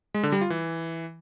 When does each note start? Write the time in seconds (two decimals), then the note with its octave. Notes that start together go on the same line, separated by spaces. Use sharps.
0.14 G#3
0.23 D3
0.32 G3
0.41 F4
0.50 E3